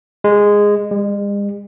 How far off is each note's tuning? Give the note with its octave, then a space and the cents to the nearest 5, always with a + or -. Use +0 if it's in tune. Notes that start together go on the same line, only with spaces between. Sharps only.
G#3 -10
G#3 -45